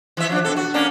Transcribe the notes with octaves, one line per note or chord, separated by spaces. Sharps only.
E3 E5
F3 D4
B2 A4
F#4
A#3 C#4 D4